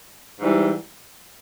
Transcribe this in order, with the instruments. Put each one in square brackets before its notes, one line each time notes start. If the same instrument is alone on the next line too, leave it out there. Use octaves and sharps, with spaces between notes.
[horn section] G#2 E3 G3